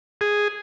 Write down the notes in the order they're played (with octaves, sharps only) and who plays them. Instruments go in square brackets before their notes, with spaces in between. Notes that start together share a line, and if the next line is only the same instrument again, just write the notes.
[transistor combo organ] G#4